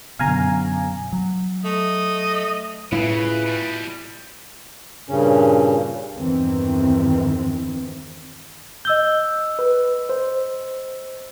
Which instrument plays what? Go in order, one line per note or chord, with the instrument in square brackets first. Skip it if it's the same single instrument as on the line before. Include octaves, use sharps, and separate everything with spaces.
[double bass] F#2 [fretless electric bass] B2 D3 B3 [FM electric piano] F5 G#5 A#5
[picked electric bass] F#3
[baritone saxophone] A3 [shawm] D#5
[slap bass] A2 [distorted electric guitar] C#3 [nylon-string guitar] E4 F4 [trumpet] B4
[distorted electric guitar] B2 G3
[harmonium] G2 A#2 C#3 C#4
[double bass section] E2 G2 D#3 E3 C4
[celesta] D#5 E6 G7 [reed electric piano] G6
[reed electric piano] B4
C5